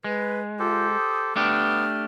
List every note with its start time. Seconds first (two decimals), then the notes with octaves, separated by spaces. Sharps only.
0.04 G#3 B4
0.59 F4 G4 A4 C5
0.97 D#6
1.36 A3 B3 D4 G4 F6